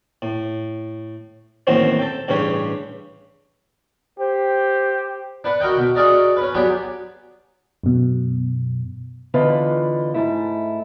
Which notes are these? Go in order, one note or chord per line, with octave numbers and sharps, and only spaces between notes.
A2
A1 D#2 A2 F#3 C4 C#4
A4 G5
A1 G2 C#3 C#4 G4 C#5
G4 C5
D4 B4 F#5
F#4 A#4 D#5 G5
B2
F#4 G#4 A#4 D5 D#5
C#4 B4
F#3 B3 D4 G4 G#4
F#2 B2
E2 D3 F4 B4 D#5 F5
G#2 A3 E4